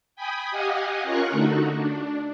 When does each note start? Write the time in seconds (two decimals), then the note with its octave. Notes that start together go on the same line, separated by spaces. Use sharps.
0.16 G5 G#5 B5 D#6
0.51 G4 D#5 F5 F#5 G#5
1.03 C#4 F4 A#4 C#6 F#6
1.31 D3 A3 D#4 F#4
1.77 D4